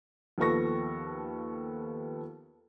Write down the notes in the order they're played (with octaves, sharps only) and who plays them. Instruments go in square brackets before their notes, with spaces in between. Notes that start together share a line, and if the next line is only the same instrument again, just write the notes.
[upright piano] D#2 F3 B3 A4 C#6 A#6